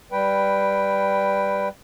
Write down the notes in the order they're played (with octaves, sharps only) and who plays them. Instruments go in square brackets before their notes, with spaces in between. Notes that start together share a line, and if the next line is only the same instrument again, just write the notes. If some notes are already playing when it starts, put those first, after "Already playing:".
[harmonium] G3 B4 G5